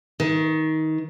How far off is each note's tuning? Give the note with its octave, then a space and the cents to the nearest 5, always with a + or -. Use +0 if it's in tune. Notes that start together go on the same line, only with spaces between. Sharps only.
D#3 +20